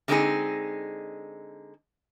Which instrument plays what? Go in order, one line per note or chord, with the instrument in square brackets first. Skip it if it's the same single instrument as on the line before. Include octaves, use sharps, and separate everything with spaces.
[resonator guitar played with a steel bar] D3 G#3 A3 C4 D#4 G#4